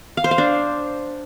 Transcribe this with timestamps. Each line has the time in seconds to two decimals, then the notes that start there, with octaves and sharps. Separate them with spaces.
0.17 F5
0.24 C5
0.31 F5
0.38 D4